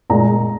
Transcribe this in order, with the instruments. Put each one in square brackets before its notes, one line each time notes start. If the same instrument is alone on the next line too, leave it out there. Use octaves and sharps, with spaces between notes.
[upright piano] A#2 G#3 A#5